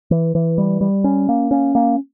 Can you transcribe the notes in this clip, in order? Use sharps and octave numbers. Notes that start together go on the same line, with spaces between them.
E3
E3
G3
G3
C#4
A#3
C#4
A#3